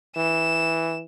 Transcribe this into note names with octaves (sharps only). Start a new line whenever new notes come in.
E3 E7